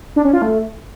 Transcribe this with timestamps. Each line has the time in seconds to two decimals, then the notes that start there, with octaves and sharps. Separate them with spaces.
0.16 D4
0.25 C#4
0.33 F4
0.42 A3